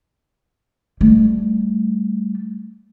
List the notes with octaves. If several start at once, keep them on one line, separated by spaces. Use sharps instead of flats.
G3 A3